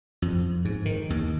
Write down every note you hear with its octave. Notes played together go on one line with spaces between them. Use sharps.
F2
G#2
D#3
D#2